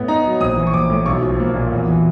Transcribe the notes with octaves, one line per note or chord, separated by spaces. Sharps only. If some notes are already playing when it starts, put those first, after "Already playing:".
Already playing: A2 B3
D#4 A#5
F#3
A#1 D#6
E3
C#6
A#1 D6
A2
B1 C#6
F3
A#3
A#2
E2
E3